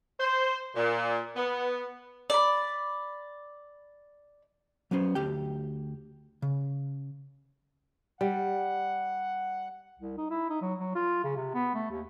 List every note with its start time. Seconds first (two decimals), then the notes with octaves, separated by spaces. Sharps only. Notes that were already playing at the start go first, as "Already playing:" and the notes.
0.19 C5
0.76 A#2
1.36 B3
2.30 D5 B5
4.91 F#3 B3 C#4 C5
5.15 D2 G4 G5
6.42 C#3
8.21 G3 F#5
9.99 C2
10.17 D#4
10.31 E4
10.50 D#4
10.62 F#3
10.79 F#3
10.95 F4
11.24 C#3
11.36 C3
11.54 B3
11.74 A3
11.91 D#2